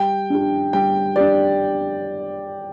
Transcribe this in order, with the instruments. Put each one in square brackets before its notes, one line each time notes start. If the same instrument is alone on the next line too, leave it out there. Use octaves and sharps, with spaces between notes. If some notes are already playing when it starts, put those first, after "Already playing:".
Already playing: [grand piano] G3 [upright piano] G5
[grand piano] D4 G4
[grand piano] G3 [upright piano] G5
[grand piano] D4 G4 [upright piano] D5